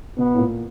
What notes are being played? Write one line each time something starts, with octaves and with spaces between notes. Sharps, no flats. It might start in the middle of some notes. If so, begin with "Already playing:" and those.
B2 B3
A2
A#2